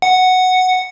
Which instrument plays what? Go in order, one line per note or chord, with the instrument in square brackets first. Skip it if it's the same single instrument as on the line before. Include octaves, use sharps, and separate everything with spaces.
[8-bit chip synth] F#5